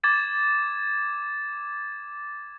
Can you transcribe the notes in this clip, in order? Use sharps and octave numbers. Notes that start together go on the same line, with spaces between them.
D6 G#6 A6 E7